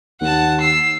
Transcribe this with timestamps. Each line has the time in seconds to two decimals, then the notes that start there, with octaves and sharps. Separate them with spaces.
0.21 D#2 F#5 A5
0.61 E6 C7